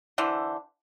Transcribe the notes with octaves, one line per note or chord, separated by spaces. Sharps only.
D3 E3 C5